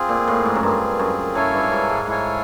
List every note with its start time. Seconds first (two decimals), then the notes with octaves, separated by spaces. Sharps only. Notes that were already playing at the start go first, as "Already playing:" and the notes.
Already playing: C4 F4 G#4
0.09 A#2
0.28 A2
0.45 G#2
0.55 F#2
0.63 G2 C4 F4 G#4
0.99 F#2
1.35 F#2 E4 A4 C#5 F5 G#5
1.54 G2
1.72 G#2
1.90 G#2
2.07 G#2 E4 A4 C#5 F5 G#5